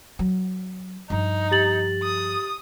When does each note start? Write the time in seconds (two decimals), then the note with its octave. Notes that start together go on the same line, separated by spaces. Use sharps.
0.19 F#3
1.10 G2 F3 D#4
1.51 G4 A6 F#7
2.03 D#6